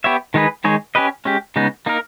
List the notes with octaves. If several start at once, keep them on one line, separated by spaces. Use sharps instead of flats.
B3 G4 C#5 E5
D#3 G#3 D#4 G#4 B4
D#3 G#3 D#4 G#4 C#5
C#4 G4 B4 D#5
G#3 C#4 G4
C#3 G#3 B3 D#4
A#3 D#4 A#4